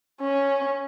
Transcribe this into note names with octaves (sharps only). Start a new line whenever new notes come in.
C#4